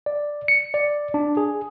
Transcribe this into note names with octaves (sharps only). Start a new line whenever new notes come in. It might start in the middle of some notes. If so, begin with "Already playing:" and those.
D5
C#7
D5
D4
G#4